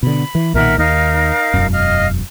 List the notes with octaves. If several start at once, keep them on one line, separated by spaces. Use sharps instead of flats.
B2 D3 B5
E3
B1 A#2 D#3 A#4 E5 F#5
D#2 D#4 A#4 F5
E1 F#2
D#5 F5 F6